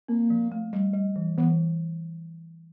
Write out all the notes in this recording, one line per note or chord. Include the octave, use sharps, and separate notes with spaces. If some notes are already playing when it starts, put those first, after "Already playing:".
A#3 C4
F3
A3
G3
G3
E3
E3 B3